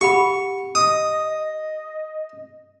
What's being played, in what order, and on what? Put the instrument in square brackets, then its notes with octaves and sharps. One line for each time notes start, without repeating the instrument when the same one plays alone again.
[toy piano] G4 F#5 B5 [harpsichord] C#6
[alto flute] D#5 [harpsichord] D#6
[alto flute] D#5